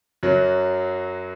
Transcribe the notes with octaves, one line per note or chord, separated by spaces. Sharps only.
F#2 F#3